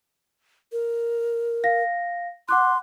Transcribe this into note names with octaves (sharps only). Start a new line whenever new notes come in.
A#4
F5 A#6
F#5 C6 D6 F#6